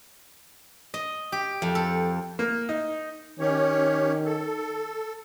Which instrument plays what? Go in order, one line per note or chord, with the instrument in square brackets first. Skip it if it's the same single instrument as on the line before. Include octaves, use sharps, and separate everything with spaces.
[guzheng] D#5
G4
F2
A4
[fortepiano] A#3
D#4
[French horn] D#3 [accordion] C#4 G4 C#5
[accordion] A4